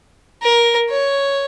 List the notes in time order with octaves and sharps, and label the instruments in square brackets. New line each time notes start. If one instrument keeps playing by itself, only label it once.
[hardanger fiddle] A#4
C#5